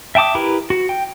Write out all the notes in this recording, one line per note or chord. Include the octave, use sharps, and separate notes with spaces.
E5 G5 A5 D6 D#6
E4 G4 A#4 B4
F#4
G5